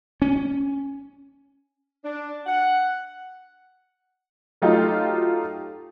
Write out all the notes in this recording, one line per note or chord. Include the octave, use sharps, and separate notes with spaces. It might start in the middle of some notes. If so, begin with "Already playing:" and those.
C#4
D4
F#5
F#3 A3 D#4 F4 G4